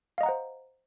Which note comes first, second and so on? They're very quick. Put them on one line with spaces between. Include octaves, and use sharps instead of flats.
F5 D#5 A#5 F#5 C5